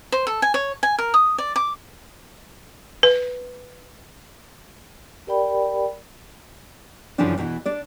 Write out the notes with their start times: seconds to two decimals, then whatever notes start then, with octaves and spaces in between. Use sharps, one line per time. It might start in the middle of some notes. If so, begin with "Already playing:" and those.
0.12 C5
0.27 A4
0.42 G#5
0.54 C#5
0.83 G#5
0.99 A#4
1.14 D#6
1.38 D5
1.56 D6
3.03 B4
5.27 G4 A#4 D5 G5 B5
7.18 F#2 C#3 E3 F3 D4
7.38 E2 B2 D#3 E3
7.66 D4 D5